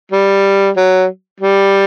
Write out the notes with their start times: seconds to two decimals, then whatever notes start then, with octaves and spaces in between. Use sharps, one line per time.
0.12 G3
0.77 F#3
1.40 G3